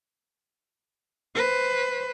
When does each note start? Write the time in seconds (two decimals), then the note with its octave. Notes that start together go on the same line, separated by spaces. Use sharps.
1.36 B4 C5